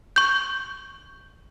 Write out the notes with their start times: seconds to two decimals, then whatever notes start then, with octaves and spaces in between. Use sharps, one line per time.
0.16 C#6 G6